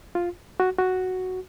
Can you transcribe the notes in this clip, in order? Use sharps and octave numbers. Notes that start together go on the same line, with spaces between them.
F4
F#4
F#4